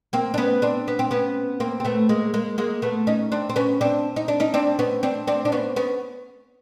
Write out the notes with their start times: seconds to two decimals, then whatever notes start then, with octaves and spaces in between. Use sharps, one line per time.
0.13 A#3 C4
0.34 D4
0.38 B3 C#4
0.62 C4 D4
0.88 B3
0.99 C4
1.11 B3 C#4
1.60 A#3 C4
1.80 C4
1.85 A3 B3
2.09 G#3 A#3
2.34 G#3 A#3
2.58 G#3 A#3
2.82 A3 B3
3.07 C#4 D#4
3.32 C4 D4
3.49 C4
3.56 B3 C#4
3.81 C4 D4
4.16 D#4
4.28 D4
4.40 C#4 D#4
4.54 C4 D4
4.79 B3 C#4
5.03 C4 D4
5.27 C4 D4
5.45 D4
5.52 B3 C#4
5.76 B3 C#4